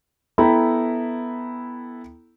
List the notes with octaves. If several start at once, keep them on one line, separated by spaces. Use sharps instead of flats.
B3 E4 A4 G5 A#5 B5